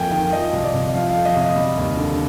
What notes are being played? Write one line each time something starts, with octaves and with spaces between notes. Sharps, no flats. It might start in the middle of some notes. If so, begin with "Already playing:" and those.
Already playing: F2 A#3 G5 G#5
D#3 G5
F3 D#5
C2
D5
C3
D#5
F3 F5
F2 F5
D#5
C3 D#5
G3
D#2
D3